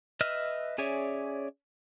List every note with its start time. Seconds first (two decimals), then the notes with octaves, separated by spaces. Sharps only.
0.21 B4 D#5 E5 E6 F6
0.78 C#4 G#4 C#5 D5 E5